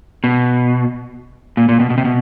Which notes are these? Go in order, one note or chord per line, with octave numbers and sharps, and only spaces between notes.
B2
A#2
A#2
B2
B2
C3
B2